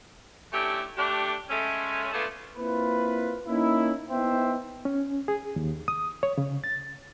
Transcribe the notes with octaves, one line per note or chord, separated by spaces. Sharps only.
A3 C#4 D4 E4 G4
A3 D4 G4
G#3 A3 C#4
A3 B3 D4 F4 G#4 A4
A#3 C4 E4 F4 B4
A#3 C#4 D#4 E4
B3 D#4 E4 C5 E5 G5
C#4
G#4
D#2
D#6
C#5
C#3
A6